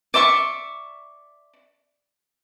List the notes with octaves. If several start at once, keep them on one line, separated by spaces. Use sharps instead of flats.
D5 E5 C6 C#6